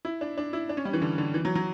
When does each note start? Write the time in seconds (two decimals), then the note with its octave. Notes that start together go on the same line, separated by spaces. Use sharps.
0.05 E4
0.21 D4
0.38 D4
0.53 E4
0.69 D4
0.77 C#4
0.85 G3
0.93 E3
1.02 D3
1.18 D3
1.34 E3
1.45 F#3
1.55 F#3